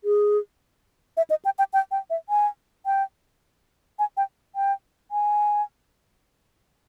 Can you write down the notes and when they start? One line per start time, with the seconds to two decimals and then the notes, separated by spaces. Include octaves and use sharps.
0.04 G#4
1.17 E5
1.30 D#5
1.45 G5
1.59 G5
1.73 G5
1.91 G5
2.10 E5
2.29 G#5
2.86 G5
3.99 G#5
4.17 G5
4.56 G5
5.11 G#5